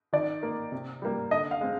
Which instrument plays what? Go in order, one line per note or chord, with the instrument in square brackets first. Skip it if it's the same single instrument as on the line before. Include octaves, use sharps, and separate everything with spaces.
[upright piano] D#3 D5
A#3
C3
G3 A#3
D3 D#5
F5
G#3 C4